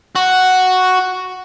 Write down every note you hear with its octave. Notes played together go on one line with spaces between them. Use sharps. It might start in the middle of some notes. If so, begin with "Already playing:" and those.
F#4